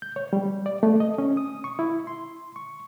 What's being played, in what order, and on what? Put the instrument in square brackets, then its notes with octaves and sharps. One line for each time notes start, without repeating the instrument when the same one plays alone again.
[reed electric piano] G6
C#5
G3
D5
A3
D#5
C#4
D#6
C#6
E4
C6
C#6